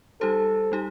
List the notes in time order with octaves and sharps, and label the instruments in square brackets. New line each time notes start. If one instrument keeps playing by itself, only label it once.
[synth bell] G3 D#4 G4 C5 [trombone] A4
[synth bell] G3 D#4 G4